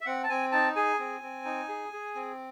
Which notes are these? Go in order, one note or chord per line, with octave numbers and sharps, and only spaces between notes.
E5
C4 F#5
A5
C4 G#5
D#4 A5
G#4 G#5
C4
C4
D#4
G#4
G#4
C4